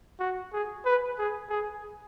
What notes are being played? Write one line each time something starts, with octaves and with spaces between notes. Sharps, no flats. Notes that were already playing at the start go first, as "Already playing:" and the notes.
F#4
G#4
B4
G#4
G#4